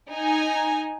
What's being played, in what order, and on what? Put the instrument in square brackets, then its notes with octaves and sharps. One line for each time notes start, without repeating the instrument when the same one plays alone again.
[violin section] D#4 G#5